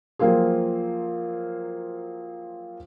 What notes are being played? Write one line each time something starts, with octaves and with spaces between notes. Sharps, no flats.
F3 F#3 A#3 C4 F4 G#4